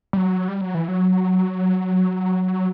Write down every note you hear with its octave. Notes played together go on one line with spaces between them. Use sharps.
G3
F#3
G3
F#3
E3
F#3